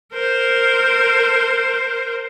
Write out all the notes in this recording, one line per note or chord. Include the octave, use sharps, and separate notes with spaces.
A#4 C5